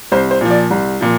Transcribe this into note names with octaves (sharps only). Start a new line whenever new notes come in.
C2 C5
C5
A#2 F3
D5
C2
A#2 F3